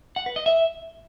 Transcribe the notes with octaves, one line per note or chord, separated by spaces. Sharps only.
F#5
B4
D#5
E5